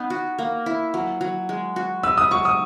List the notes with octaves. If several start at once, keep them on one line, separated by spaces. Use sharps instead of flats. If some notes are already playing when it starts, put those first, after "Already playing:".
Already playing: B3 D#4
F#4
A#3
E4
F#3
F#3
G#3
F#4
B4 E6
D#6
F#3 C#6
D#6